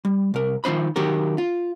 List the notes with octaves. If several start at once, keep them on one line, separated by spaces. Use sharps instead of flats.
G3
C2 A#4
D#3 F3 C#4 C5 B5
D#3 F#3 G4 A#4
F4